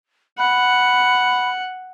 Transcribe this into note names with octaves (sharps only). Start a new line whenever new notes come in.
F#5 B5